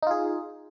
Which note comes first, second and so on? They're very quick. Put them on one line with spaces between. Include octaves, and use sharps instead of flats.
D#4 F4 G#4